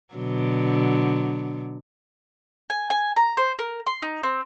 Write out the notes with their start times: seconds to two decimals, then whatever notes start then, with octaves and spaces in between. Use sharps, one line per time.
0.14 B2 D3 F#3
2.70 G#5
2.90 G#5
3.16 A#5
3.37 C5
3.59 A#4
3.87 C6
4.02 D#4
4.23 C4